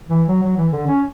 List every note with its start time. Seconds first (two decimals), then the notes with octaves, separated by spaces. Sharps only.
0.09 E3
0.28 F#3
0.42 F#3
0.57 E3
0.72 D3
0.87 C#4